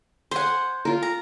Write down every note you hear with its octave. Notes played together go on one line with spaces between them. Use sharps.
C5 F#5 G#5 C6
F4 A#4
A#5